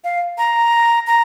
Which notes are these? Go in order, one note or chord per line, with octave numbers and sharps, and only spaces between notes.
F5
A#5
A#5